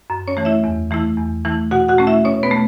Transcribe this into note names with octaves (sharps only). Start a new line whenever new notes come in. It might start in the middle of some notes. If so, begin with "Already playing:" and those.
F#2
C#4 C#5
E3 A3
E4 E5
E2
E3 A3 E4
E2
E3 A3 E4
B2 F#4 F#5
F#4 F#5
A3 C#4
E4 E5
B2 C#4 C#5
B3 B4
A3